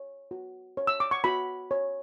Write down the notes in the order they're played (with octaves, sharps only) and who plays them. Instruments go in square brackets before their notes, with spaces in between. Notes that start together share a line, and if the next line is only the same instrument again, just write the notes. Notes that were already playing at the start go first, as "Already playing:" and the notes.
Already playing: [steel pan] C#5
F#4
C#5
E6
D6
C#6
F#4 B5
C#5